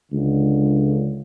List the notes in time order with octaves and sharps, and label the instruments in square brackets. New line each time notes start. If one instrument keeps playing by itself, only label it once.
[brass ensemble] C#2 D3